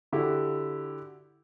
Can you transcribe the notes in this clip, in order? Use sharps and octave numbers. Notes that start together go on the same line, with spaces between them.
D3 E4 F#4 G4